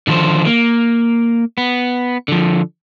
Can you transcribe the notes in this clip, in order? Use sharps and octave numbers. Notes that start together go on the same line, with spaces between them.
D3 D#3 F3 A4 C5
A#3
B3
D3 F3